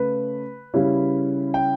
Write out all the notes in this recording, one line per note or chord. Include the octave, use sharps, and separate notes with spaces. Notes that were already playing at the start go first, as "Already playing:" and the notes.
Already playing: C#3 A3 B4
C#3 G3 C#4 E4
G5